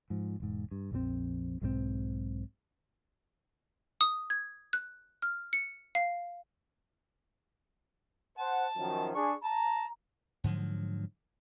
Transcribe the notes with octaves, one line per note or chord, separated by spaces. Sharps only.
G#2 F3
E1 G#2
G2
A#1 F2 E3 C4
B1 G#2 F#3 C4
D#6
G#6
F#6
F6
C#7
F5
C5 F#5 A5
F#2 D#3 F3
D4 G#4 C#6
A5 A#5
G#2 D3 F3 F#3